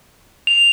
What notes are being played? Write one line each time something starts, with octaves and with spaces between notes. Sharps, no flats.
F7